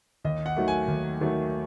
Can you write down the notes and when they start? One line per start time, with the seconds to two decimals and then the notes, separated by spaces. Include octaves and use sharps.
0.24 D#2 D#5
0.46 F#5
0.56 D#3 F#3 A3
0.68 G#5
0.88 D#2
1.21 D#3 F#3 A3